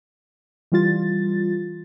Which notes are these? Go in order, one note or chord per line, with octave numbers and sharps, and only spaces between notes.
E3 G3 F4 A6